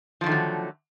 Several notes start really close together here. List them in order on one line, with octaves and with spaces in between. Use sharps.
F3 D3 D#3 A3 F#3